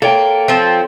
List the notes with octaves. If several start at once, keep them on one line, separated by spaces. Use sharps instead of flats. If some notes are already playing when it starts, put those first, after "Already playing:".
A#3 A4 C#5 G5
F3 C4